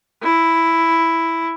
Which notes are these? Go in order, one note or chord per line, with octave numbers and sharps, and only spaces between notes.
E4